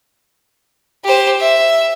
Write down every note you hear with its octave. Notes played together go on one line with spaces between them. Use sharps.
G4 C5
E5